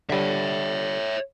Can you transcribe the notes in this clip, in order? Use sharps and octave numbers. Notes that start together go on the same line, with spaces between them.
D3 G3 C#5 E5